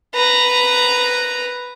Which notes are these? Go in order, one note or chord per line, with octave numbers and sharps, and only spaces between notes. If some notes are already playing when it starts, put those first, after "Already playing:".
B4 A#5